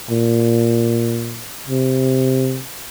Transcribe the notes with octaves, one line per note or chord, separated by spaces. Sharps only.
A#2
C3